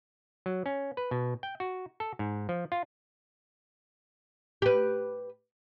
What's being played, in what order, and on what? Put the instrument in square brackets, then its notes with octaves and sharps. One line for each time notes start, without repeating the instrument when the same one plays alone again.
[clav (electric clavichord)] F#3
C#4
B4
B2
G5
F#4
A4
G#2
F3
F4
[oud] G4 B4